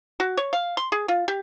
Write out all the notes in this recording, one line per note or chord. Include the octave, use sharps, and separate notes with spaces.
F#4
C#5
F5
C6
G#4
F4
G4